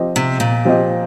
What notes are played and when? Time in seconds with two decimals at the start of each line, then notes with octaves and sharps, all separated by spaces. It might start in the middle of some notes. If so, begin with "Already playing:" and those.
Already playing: F3 C4 G4 C5 D#5
0.16 C3
0.40 A#2
0.65 F3 C4 G4 C5 D#5